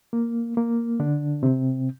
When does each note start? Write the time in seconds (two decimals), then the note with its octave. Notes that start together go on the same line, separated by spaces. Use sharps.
0.13 A#3
0.57 A#3
1.00 D3 D4
1.43 C3 C4